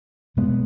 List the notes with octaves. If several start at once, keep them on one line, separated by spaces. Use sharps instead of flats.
B2 G#3 B3